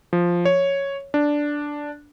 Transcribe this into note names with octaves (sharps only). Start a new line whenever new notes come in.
F3
C#5
D4